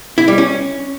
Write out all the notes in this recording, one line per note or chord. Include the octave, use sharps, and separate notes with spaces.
E4
G3
C#4